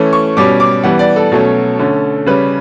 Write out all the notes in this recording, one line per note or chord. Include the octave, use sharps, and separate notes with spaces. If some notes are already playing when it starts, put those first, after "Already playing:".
Already playing: E3 A3 C#4
C#6
B2 G3 C#4 D6
D6
E3 G3 B3 F#5
D5
A4
B2 F#3 A3 C#4
D3 A3 C#4
C#3 G3 C#4 B4